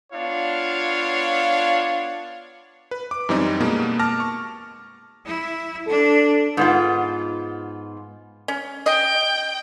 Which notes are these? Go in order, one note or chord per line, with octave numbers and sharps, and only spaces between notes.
B3 D4 F4 C#5 F5
B4
D6
F#2 E3 G3 C4 D#4
B2 G#3 A#3 B3
A5 D6 F6 A#6
C#6
E4
D4 A4
G#2 B3 F4
C#4
D#5 G5